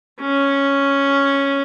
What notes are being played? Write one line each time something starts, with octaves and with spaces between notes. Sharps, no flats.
C#4